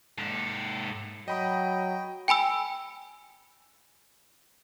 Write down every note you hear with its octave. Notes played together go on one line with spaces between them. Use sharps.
G#2 A4
F#3 D#5 G5 B5 D#6
G5 G#5 B5 E6